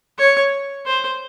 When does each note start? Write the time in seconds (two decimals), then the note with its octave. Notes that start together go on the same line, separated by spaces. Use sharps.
0.19 C#5
0.87 C5